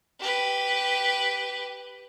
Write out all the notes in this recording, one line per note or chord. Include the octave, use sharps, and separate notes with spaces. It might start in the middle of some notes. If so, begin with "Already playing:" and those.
G4 B4